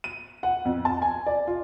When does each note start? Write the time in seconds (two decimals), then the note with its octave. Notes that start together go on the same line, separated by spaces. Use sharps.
0.04 D#7
0.43 F#5
0.65 F2
0.85 A5
1.02 G#5
1.26 D5
1.47 F4